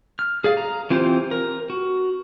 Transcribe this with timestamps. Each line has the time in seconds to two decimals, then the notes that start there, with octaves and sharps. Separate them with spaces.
0.19 F6
0.44 G#4 D5 F5
0.57 A#5
0.90 E3 C4 F4 G4 C5
1.31 A#4
1.70 F#4